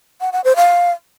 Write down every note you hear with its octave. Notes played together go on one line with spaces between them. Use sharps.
F#5
F#5
C5
F5